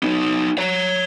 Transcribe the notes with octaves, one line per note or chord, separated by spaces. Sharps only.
B3 D#4
C#5 A#5